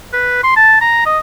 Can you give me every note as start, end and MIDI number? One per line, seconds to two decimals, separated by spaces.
0.13 0.43 71
0.43 0.55 84
0.56 0.78 81
0.81 1.01 82
1.06 1.19 75